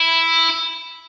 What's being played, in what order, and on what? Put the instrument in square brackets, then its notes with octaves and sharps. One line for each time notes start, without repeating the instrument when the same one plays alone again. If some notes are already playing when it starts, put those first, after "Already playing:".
Already playing: [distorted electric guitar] E4